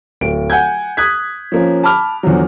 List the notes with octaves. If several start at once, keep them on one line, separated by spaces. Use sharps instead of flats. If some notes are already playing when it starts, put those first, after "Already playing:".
D1 D7
F#5 G#5 G6 G#6
D#6 F#6 G#6 B6
F3 A#3 C#4
A5 B5 D6 F6
E2 D3 F3 F#3